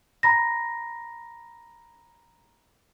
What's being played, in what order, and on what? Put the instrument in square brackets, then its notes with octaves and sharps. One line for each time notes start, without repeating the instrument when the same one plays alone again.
[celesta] A#5 B5 A#6